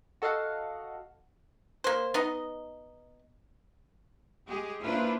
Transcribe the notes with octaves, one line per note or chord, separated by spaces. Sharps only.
F#4 A4 D#5 F5 F#5
A#3 C5
B3 D#4 D#5
G#3 G4 G#4
A#3 D4 E4 F4 B4 C5